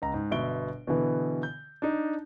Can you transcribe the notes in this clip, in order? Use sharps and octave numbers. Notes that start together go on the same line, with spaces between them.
C#2 A#5
G#2
G1 B2 E5 D7 G7
B2 D3 E3 B3
G6
D4 D#4